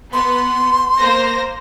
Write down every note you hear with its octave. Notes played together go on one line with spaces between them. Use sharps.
B3 C6
A#3 C5 A#6